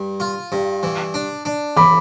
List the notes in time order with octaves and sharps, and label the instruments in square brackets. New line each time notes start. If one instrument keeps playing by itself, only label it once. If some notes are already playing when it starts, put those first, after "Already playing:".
Already playing: [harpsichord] G2
F4
G2
E3
D4
D4
[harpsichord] E3 [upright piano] B5 D6